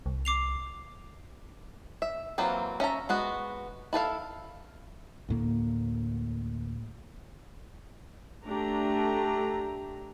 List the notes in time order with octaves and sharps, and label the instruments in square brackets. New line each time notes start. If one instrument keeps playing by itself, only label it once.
[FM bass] C2
[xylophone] D6 C7 F7
[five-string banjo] E5
E3 F#3 A#3 C4 F4
C#4 E5 A5 A#5
G#3 B3 F#4
E4 A4 B4 F5
[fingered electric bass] D2 A2 A#3
[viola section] A3 D4 G4 A#5